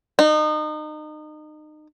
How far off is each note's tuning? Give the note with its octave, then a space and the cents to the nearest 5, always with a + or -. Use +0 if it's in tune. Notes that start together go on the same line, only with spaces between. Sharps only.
D#4 -30